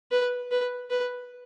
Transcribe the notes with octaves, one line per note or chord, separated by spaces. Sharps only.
B4
B4
B4